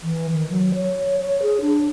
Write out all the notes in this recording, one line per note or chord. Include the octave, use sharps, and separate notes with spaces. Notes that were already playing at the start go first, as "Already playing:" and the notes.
E3
D#3
F#3
C#5
C#5
G#4
D4